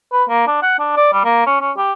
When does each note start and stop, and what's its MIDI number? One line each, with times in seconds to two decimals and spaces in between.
0.12 0.24 71
0.29 0.45 58
0.47 0.58 62
0.62 0.79 78
0.79 0.94 62
0.97 1.08 74
1.13 1.23 55
1.25 1.42 58
1.47 1.58 61
1.61 1.71 61
1.77 1.93 67